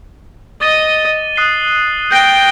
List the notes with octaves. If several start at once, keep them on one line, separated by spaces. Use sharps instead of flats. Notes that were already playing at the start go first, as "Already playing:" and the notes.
D#5 D6 A6 D#7 G7
D#6 F#6 C7 G7
G5 G6 A#6 D7 G7